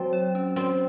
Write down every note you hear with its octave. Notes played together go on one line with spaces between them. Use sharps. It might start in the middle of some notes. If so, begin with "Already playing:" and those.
Already playing: F#3 C4 F#4 C#5
C#5
C#4
C4 F#4